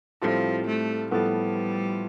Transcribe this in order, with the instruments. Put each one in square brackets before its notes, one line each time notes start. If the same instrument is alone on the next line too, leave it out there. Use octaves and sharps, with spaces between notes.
[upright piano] A2 G3 C4 F4 A4 [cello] F3
[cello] A3
[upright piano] A2 F3 B3 F4 A4 [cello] G3